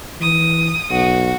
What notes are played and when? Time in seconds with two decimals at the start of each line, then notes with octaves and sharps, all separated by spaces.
0.21 E3 D#6
0.90 B1 F#4